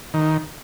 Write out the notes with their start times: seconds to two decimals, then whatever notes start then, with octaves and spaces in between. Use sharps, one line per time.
0.14 D#3